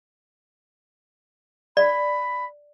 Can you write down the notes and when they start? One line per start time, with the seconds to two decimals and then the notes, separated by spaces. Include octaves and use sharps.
1.77 D5 B5